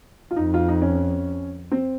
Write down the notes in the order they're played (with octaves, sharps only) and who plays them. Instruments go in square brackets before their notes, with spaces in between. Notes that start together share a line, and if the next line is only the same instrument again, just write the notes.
[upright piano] F4
[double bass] F2 [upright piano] D#4
[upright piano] F4
D#4
C#4
C4